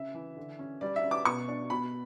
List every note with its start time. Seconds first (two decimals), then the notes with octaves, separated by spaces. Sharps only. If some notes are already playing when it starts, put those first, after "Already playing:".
Already playing: C#3 E5
0.14 E3
0.37 D3
0.59 C#4
0.81 G3 D5
0.96 E5
1.04 C#4
1.11 D6
1.25 B2 C#6
1.48 D4
1.70 B2 B5